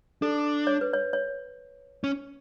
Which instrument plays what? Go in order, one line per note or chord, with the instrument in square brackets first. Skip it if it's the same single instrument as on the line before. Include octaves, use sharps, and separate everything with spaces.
[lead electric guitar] D4 [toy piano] A4
[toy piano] C#5
B4
C#5
C#5
[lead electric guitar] C#4